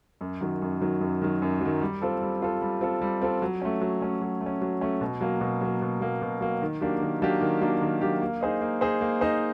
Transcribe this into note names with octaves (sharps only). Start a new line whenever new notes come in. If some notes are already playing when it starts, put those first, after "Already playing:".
F#2
D#3 F#3
F#2
D#3 F#3
F#2
D#3 F#3
F#2
D#3 F#3
G3
C4 F4 A4
G3
C4 F4 A4
G3
C4 F4 A4
G3
C4 F4 A4
F#3
A3 C#4
F#3
A3 C#4
F#3
A3
C#4
F#3
A3 C#4
B2
F#3 A#3
B2
F#3 A#3
B2
F#3 A#3
B2
F#3 A#3
D#3
F#3 A#3 D4 G4
D#3
F#3 A#3 D4 G4
D#3
F#3 A#3 D4 G4
D#3
F#3 A#3 D4 G4
A#3
D#4 G#4 C5 D#5
A#3
D#4 G#4 C5 D#5
A#3
D#4 G#4 C5 D#5